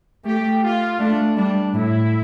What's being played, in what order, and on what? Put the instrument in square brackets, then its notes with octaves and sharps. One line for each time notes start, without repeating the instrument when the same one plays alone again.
[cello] A3 [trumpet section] G4
[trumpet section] F4
[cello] A3 [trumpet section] D4
[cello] G3 [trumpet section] D4
[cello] A2 [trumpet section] E4